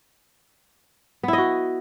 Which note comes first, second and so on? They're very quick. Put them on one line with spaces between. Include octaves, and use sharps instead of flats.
B3 E4 D#5 F#4